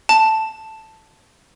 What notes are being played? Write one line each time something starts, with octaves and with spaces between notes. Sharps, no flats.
A5